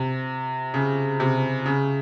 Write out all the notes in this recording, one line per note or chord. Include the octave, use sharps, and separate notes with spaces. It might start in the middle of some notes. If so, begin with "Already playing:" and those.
Already playing: C3
C#3
C3
C#3